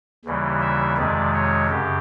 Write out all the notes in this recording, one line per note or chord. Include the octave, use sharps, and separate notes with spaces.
D#2 C#3 E3 G3
E5
F2 C3 D#3 G#3 D5
C#5
F#2 C#3 G4